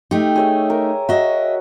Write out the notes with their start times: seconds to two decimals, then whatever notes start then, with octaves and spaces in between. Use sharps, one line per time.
0.11 A3 D#4 G4
0.36 G#4 C#5 E5
0.70 A#4
1.09 F#4 D#5 E5